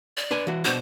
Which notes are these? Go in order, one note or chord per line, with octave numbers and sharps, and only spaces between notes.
D5
D4 B4 G#5
E3 F#4
B2 D4 F#4 C5